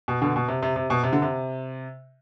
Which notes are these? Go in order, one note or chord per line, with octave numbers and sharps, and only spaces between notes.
B2
B2 D3
B2
C3
C3
C3
B2
C3
D3
C3